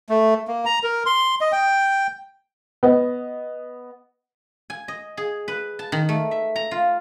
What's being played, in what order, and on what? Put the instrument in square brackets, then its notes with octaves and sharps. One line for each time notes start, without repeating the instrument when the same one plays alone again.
[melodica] A3
A#3
A#5
A#4
C6
D#5
G5
[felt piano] B3 D#5
[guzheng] G#5
D#5
G#4
B4
A5
D#3
A3
E5
A#5
F4